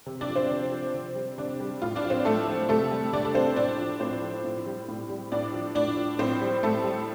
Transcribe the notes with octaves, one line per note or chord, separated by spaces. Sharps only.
C3
D4 D5
F3
C4 C5
C3
F3
C3
G3
C3 D4
G3
A2 F4
D4 D5
F3
C4 C5
A2 A3 A4
F3
C3 A3 A4
G3
C3 D4 D5
A4
G3 C4 C5
A2 D4 D5
F3
A2 C4 C5
F3
A2
G3
A2
G3
A2 D4 D5
F3
A2 D4 D5
F3
A2 C4 C5
G3
A2 A3 A4
G3